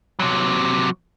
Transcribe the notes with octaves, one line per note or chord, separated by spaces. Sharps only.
C3 F#3